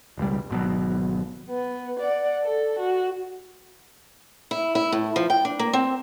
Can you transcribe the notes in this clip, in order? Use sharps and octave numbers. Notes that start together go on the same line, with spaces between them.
E1 C#2 G3
G#1 B2 F#3
B3
D5 F#5
A4
F#4
E4
E4
A2
F3
G5
D4
A#3
C4